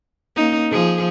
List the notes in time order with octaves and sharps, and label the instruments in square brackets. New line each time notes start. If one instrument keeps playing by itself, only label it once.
[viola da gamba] A#3 C#4 D#4
F3 G#4